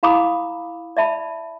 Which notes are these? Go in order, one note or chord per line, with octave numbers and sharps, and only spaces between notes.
E4 F5 A#5 B5 D6 D#6
D5 E5 A5 B5